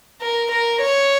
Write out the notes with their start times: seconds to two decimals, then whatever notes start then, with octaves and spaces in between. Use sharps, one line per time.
0.21 A#4
0.52 A#4
0.82 C#5